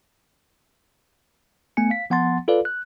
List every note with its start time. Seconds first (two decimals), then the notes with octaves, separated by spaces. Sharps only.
1.77 A3 B3 G#5 C#7
1.90 F5 B6
2.10 F3 B3 F#5 A5 C6 A6
2.48 F4 A4 B4 D5 F5
2.65 F#6